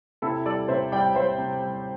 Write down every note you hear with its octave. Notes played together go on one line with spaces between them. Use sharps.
C3 E4 A4
G3 A4 D5
C3 C5 E5
G3 D5 G5
G3 C5 E5
C3
G3